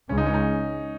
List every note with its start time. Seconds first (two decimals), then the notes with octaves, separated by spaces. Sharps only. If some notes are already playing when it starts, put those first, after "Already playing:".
0.09 C#2 C#3 G#3 C#4
0.18 D#4
0.26 C#4
0.34 D#4